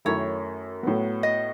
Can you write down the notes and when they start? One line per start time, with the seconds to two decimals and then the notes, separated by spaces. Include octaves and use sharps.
0.05 F#2 D#3 A3 C#4 E4 C#5
0.83 A2 F#3 B3
1.23 D#5